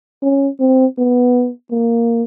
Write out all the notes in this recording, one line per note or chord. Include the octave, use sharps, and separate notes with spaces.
C#4
C4
B3
A#3